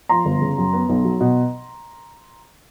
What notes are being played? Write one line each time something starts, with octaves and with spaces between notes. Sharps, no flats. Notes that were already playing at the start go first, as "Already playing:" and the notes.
F3 A#5 C6
G1
C#3
F#2
B3
B1
F#3
B2